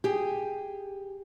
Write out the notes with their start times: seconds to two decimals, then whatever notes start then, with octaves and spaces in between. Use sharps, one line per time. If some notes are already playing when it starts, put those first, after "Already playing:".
0.04 G4 G#4